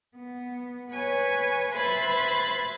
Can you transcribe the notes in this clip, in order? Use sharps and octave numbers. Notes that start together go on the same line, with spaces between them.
B3
B4 C#5 G#5
B4 C5 E5 B5 G#6 A6